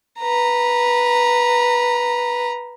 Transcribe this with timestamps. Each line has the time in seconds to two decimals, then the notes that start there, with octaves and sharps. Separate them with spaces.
0.19 B4 A#5